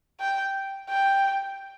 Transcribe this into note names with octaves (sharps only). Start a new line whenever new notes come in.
G5
G5